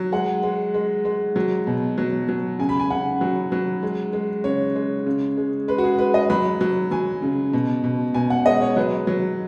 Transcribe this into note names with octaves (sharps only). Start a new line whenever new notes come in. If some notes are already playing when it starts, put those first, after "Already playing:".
Already playing: F#3
G#3 F#5
G#3
G#3
G#3
F#3
B2
F#3
F#3
C#3 G#5
B5
G#5
C#3 F#5
F#3
F#3
G#3
G#3
C#3 C#5
G#3
C#3
G#3
G#3 B4
F#4
G#4
G#3 B4
D#5
F#3 B5
F#3
F#3 G#5
C#3
B2
B2
B2 G#5
F#5
G#3 D#5
C#5
F#3 B4
F#3